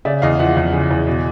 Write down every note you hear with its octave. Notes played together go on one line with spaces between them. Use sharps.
C#3 D5 E5
E2 D#5 F5
F3 E5 F#5
E2
C#3
E2
B2